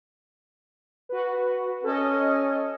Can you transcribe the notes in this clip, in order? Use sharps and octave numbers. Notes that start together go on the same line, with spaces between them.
F#4 B4
C#4 A4 D#5